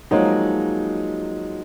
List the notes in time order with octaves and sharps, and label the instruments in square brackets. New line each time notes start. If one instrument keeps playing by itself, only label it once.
[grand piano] F3 G#3 D#4 [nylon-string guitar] F#3 A#3